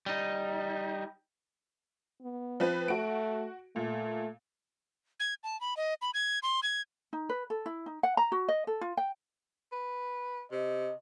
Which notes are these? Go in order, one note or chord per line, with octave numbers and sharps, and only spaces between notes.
G3 D#4
B3
F3 C4 B4
A3 F#4 D7
A#2 A3
G#6
A5
B5
D#5
B5
G#6
C6
G#6
D#4
B4
A4
E4
D#4
F#5
A#5
F#4
D#5
A4
F4
G5
B4
C3 D#5